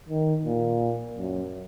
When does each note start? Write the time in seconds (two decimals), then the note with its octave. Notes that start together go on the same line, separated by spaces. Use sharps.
0.09 D#3
0.45 A#2
1.17 F#2